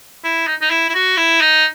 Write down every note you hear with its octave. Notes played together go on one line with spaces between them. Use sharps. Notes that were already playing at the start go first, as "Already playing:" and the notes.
E4
D#4
D#4
E4
E4
F#4
E4
D#4